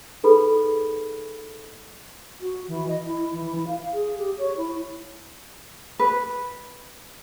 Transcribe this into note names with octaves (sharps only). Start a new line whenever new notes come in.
D#4 G#4 A4 B4 B5
F#4
E3
D#5
E4
E3
E4
F5
G#4
G4
C#5
E4
B4